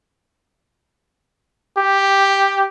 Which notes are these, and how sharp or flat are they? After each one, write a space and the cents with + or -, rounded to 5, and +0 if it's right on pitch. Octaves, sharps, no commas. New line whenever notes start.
G4 +0